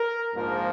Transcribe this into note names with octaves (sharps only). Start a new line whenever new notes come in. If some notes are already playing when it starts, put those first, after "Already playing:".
Already playing: A#4
A#1 G#2 F3 A#3 A#4